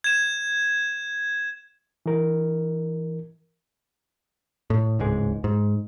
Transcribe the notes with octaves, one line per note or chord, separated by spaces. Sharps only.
G#6 E7
E3 A#4
A2
D1 C#2 G#2 G#3
G#2